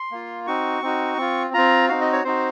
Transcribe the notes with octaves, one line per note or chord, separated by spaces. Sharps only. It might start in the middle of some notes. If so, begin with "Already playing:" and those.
Already playing: C6
A#3 F4
C4 D#4 F#4 C#6
C4 D#4 F#4
C4 F4
C4 F4 A#5
C4 D#4 F#4 F5
D#5
C#5
C4 D#4 F#4 C5